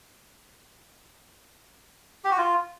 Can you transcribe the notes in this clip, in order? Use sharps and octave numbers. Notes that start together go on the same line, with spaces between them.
G4
F#4
F4